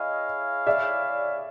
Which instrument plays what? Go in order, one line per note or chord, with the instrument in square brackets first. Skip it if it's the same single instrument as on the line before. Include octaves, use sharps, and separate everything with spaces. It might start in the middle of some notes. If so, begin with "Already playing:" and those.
Already playing: [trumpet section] E4 G#4 C#5 F5 [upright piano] D#5
[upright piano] D5 E5